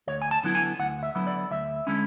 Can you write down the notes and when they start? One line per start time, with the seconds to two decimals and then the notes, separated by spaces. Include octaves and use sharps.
0.07 D2 C#5
0.22 G#5
0.31 A5
0.43 D3 F#3 B3 E4
0.55 G#5
0.79 D2 F#5
1.03 E5
1.15 D3 F#3 B3 E4
1.27 D5
1.51 D2 E5
1.87 D3 G#3 C#4 E4